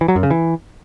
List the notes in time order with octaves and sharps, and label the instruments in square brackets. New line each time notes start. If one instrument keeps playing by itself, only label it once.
[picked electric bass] E3
F#3
F#2
C#3
E3